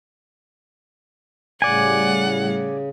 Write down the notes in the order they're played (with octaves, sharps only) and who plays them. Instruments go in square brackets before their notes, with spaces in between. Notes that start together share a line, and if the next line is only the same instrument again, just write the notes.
[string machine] A2 G3 [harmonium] C#3 [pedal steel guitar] D5 G#5 [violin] F#5